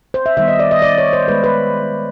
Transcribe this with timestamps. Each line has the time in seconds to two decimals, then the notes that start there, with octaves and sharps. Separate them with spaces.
0.14 C5
0.26 E5
0.37 D#3 G3 B3 E5
0.48 D#5
0.60 D5
0.71 D#5
0.82 D5
0.98 C#5
1.13 C5
1.28 D#3 G#3 B3 B4
1.44 B4